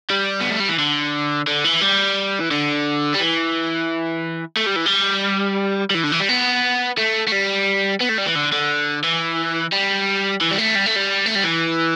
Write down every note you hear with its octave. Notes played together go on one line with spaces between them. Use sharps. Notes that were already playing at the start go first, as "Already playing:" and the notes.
G3
B3
A3
G3
E3
D3
D3
E3
G3
E3
D3
G3
E3
A3
G3
E3
G3
G3
E3
D3
E3
G3
B3
A3
A3
G3
B3
A3
G3
E3
D3
D3
E3
G3
E3
G3
A3
G3
A3
G3
A3
G3
E3